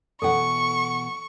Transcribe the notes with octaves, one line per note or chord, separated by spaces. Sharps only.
B2 E3 A4 F#5 C#6